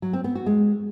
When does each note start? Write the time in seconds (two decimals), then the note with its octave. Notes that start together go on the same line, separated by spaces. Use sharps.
0.02 F#3
0.13 C4
0.24 B3
0.35 F#4
0.46 G#3